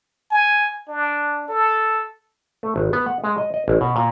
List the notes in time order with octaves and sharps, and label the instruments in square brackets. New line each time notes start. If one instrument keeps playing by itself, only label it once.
[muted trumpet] G#5
D4
A4
[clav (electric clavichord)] A3
G#1
B3
F#5
G#3
D#5
D#5
A1
B2
A#2